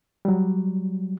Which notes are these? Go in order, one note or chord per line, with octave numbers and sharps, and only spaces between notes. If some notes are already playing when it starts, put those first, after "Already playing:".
F#3 G3